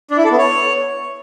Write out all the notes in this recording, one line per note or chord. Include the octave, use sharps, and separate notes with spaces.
D4
E4
A4
B3
C#5